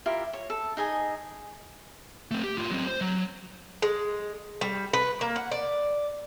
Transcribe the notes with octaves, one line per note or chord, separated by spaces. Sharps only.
E4 F4 G4 A#4
C#5
A4
D#4 G#4 D#5 G#5
A3 C4
G4
A2 F4
F#3 C4
C5
F#3
G#3
G3
B4
A#3
F#5
D5